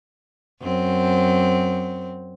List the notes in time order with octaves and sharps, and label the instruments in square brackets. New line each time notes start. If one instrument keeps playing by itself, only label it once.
[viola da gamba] F#2 C4